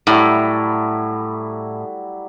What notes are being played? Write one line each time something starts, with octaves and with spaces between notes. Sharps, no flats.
A2 F#3 G3 E4